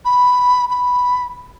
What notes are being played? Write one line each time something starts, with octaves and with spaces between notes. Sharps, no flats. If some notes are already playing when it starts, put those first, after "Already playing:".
B5
B5